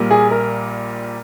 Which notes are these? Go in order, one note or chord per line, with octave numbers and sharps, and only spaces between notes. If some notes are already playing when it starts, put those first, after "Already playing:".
Already playing: A#1 A#2 G3 A#3
G#4
A#4